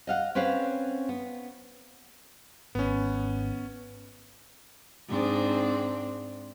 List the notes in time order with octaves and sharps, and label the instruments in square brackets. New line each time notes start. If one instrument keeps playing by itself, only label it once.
[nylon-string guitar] D#5 F5 F#5
C4 C#4 B4 C#5 F5 F#5
B3
[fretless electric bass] G#1 [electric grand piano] B3 C#4
[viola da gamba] G#2 C4 D4